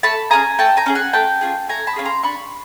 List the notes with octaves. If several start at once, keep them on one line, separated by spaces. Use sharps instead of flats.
A3 A5 B5
C#4 F4 G#4 G#5 A#5
A3 G5 A5
G#5 A#5
C#4 F4 G#4
F#5 G#5
A3 G5 A5
C#4 F4 G#4
A3 G#5 A#5
A5 B5
C#4 F4 G#4
A#5 C6
D4 B5 C#6